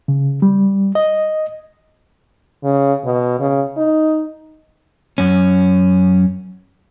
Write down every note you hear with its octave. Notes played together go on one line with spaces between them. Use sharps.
C#3
G3
D#5
C#3
B2
C#3
D#4
F#2 C#4